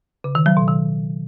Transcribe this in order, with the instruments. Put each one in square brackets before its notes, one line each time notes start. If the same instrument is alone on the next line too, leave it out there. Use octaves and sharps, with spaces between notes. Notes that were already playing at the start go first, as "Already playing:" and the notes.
[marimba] C#3
D#3
F#3
B2
D#3